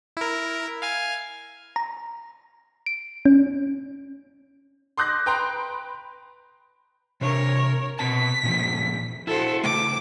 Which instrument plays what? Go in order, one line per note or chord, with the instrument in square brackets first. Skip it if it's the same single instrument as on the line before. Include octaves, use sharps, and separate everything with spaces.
[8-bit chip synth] E4 A#4
F5 G#5 F6
[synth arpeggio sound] A#5
D7
C#4
[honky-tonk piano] C6 D6 D#6 F#6 G6 A#6
B4 G5 A#5 C6
[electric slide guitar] C3 D4 [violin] A#4 C#5
[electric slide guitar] B2 C4 A5 [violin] B6
[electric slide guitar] A#2 C#3 F3
[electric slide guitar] E4 F#4 [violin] A4 C5
[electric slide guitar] C#3 A3 [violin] D6